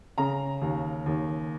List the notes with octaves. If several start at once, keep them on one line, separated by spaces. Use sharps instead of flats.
C#3 A#5
D#2
D#2